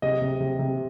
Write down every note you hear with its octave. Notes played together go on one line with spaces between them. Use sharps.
C3 D#5
C3
C3
C3